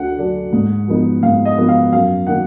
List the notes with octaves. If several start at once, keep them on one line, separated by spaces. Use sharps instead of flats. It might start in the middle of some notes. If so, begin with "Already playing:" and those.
Already playing: D2 D3 D4 F#5
D3 F#3 D4
G#2
F3 B3 D#4
G#2 F5
D#5
F3 B3 D#4
F5
F#2 F5
D#3 A#3 D#4 F#5